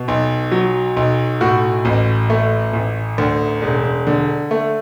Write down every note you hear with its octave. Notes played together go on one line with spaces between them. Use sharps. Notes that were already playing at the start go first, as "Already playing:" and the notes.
Already playing: B2
B1
F#3
B1
A2 F#4
A1
A3
A1
D2
E1
D3
A3